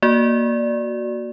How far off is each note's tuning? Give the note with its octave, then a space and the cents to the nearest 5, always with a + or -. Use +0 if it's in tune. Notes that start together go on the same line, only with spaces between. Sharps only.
A#3 +10 F#4 +0 D5 +0